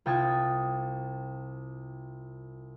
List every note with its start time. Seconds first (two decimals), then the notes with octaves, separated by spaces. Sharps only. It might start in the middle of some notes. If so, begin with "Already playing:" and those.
0.06 C2 F4 G5 A5 D#6 G#6